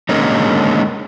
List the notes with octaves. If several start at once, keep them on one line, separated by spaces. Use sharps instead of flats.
D3 G#3 A#3 C#4 D#4